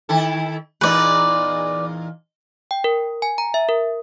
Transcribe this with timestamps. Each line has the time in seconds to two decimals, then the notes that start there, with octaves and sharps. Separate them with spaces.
0.09 D#3 E4 A4
0.81 E2 A#2 D#4 B4 D5
2.71 G5
2.84 A#4
3.22 G#5
3.38 A#5
3.54 E5
3.69 A#4